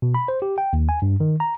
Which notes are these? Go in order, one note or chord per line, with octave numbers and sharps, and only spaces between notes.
B2
B5
C5
G4
G5
D#2
G#5
G2
D#3
A#5